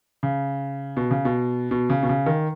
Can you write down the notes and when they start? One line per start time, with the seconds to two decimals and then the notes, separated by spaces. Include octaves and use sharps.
0.23 C#3
0.97 B2
1.11 C#3
1.25 B2
1.71 B2
1.90 C#3
2.03 B2
2.09 C#3
2.26 D#3